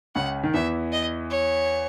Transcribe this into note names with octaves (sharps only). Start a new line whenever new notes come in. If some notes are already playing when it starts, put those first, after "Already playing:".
C#2 C#3 F#5
D#3
E2 E3 E5
D#5
C#5